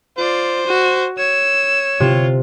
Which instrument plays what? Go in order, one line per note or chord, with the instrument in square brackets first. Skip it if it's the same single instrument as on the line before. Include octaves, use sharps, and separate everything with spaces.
[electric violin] F4 D5 [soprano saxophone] C5
[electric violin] F#4
[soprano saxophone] C#5 [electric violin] E6
[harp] C3 [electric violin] F4